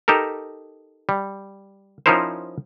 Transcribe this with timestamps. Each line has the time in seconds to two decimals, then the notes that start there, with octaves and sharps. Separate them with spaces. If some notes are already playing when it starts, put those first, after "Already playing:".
0.08 D#4 G4 A4 A#4
1.09 G3
2.06 F3 C#4 D#4 E4 A#4 C5